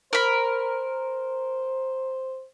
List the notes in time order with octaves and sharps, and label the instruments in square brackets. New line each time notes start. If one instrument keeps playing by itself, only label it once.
[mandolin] A#4 B5 [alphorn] C5